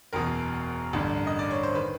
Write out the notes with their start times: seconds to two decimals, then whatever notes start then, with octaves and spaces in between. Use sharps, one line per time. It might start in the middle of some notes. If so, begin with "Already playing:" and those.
0.13 F#1 E2 B2 A#4
0.93 A1 G2 D3
1.27 D#5
1.39 D5
1.51 C#5
1.63 C5
1.75 D#3 B4